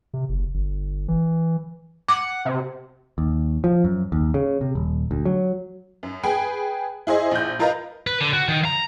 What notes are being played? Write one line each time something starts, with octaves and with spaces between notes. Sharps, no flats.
C3
F#1
G1
E3
F#5 D6
C3
D#2
F3
F#2
D#2
C#3
C3
D#1
D2
F#3
F#2
G#4 B4 G5 G#5 B5
E4 G#4 C5 D#5
A#1 G6
F4 A#4 B4 D#5 F5 A#5
B4
D3
F#4
D#3
A#5